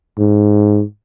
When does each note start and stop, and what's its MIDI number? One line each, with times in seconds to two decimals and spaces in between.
0.18 0.83 44